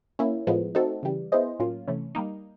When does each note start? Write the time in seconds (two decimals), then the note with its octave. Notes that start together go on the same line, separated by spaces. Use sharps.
0.19 A#3 C#4 E4
0.47 A2 F3 G#3 B3
0.75 A3 C4 D#4 F#4 A4
1.03 C#3 E3 G3
1.32 B3 E4 G#4 C5 D#5
1.59 A2 F#3 A#3 C#4 F4
1.88 C3 E3 A3 C#4
2.15 G3 A#3 D#4